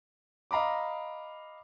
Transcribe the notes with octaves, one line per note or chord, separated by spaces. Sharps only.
D#5 F5 A#5 B5 D6